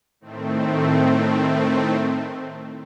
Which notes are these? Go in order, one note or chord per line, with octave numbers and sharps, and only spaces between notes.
A2 D#3 A3 C4